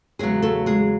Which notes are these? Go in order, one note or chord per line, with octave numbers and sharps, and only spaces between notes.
E2 C#3 F#3 G#3 G#4
A3 A4
G#3 G#4